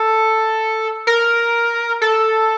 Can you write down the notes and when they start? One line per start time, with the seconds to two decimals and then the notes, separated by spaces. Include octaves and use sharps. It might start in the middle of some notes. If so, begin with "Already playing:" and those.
Already playing: A4
1.07 A#4
2.02 A4